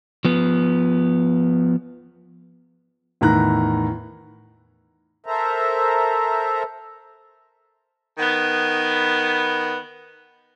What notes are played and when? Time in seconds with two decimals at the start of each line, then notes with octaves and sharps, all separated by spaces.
0.25 F3 B3
3.21 E2 A2 D#3 A#5 F#6
5.26 A4 A#4 C5 E5 A#5
8.18 D#3 B3